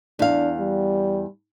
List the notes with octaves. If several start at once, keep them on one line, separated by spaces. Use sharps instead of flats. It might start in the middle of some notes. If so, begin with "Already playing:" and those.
E2 D4 F5
G3